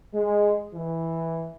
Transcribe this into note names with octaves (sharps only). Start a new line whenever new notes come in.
G#3
E3